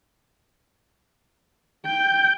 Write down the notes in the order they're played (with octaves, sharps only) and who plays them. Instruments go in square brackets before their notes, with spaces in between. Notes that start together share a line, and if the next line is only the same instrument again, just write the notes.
[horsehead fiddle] G5 [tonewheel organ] G6